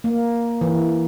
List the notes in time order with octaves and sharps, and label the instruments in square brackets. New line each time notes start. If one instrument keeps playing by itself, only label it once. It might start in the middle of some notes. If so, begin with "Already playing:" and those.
[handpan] A#3
E3